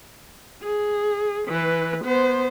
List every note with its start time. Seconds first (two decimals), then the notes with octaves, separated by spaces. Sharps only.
0.63 G#4
1.48 E3 B4
2.05 B3 C5